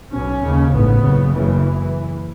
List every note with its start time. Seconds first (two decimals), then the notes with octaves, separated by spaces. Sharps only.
0.13 B1 B2 C#4
0.42 D#2 C#3
0.72 A1 G#2 B3
1.02 F#1 F#2 C#3
1.32 F#1 F#2 C#3 E3